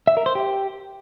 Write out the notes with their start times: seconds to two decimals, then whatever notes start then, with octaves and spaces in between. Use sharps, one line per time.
0.07 E5
0.17 A#4
0.26 C5
0.35 G4